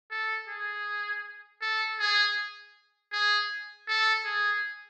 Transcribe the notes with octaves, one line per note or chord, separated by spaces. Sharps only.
A4
G#4
A4
G#4
G#4
A4
G#4